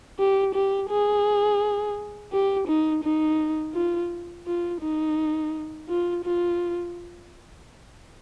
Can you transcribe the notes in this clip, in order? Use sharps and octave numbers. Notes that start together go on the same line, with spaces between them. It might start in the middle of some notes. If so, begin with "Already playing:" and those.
G4
G4
G#4
G4
D#4
D#4
F4
F4
D#4
F4
F4